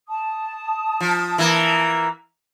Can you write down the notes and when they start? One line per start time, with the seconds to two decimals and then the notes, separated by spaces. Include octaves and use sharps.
0.07 A5 D#6
1.00 F3
1.38 E3 A#3